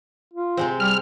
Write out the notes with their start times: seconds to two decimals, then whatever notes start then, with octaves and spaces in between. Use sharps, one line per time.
0.33 F4
0.57 C3 G#3 C4
0.80 G3 F6